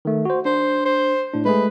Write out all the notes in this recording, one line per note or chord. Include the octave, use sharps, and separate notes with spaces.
D#3 A3
F#4 C5
D4 C5
C5
A2 D4
G#3 A3 G#4 B4